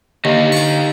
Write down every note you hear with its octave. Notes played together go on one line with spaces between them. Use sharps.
D#2 D3 D#4 G4 D#5
C#6 D6